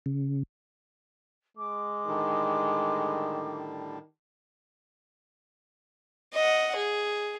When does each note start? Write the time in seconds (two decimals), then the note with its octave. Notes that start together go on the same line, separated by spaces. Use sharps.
0.06 C#3
1.57 G#3 D6
2.07 A2 D3 D#3 G3
6.34 D#5 F#5
6.76 G#4